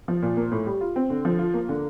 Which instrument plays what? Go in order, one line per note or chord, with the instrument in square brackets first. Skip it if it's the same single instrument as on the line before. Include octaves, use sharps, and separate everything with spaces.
[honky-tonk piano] F3
A#2
A#3
A2
G3
F4
C4
D3
F3
F4
A#3
D3